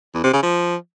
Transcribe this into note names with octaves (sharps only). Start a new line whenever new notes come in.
E2
C3
C#3
F3